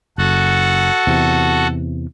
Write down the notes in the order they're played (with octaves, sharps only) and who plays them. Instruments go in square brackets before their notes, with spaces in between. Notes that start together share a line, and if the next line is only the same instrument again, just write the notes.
[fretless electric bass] F#1 [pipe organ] F#4 A4 F#5
[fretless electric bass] E2 C3